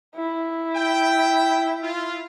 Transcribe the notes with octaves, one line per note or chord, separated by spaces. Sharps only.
E4
G5
F4